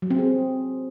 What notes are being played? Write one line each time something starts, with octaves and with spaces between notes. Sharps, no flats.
F#3
C4
G#4